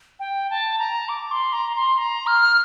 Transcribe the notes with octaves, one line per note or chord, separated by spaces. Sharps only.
G5
A5
A#5
D6
C6
A#5
C6
A#5
F6